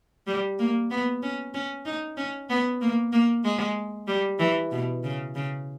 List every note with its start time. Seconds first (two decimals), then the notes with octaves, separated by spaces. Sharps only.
0.27 G3
0.59 A#3
0.91 B3
1.23 C#4
1.54 C#4
1.86 D#4
2.17 C#4
2.50 B3
2.81 A#3
3.12 A#3
3.44 G#3
4.07 G3
4.39 E3
4.72 B2
5.04 C#3
5.35 C#3